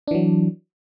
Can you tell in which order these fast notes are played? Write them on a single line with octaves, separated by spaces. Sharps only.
D4 E3 F#3